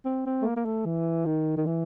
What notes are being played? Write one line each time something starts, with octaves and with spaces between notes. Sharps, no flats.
C4
C4
A3
A#3
A#3
A3
E3
D#3
D#3
E3